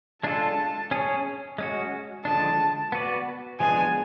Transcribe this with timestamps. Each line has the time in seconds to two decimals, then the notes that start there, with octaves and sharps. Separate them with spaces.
0.23 G#3 D4 F4 A4 A5
0.91 C#4 G#4 C#5
1.58 G#3 C#4 F#4
2.25 D3 F3 G#3 D4 A5
2.92 B3 F#4 B4 D5
3.60 F3 G#3 B3 D4 G#4 G#5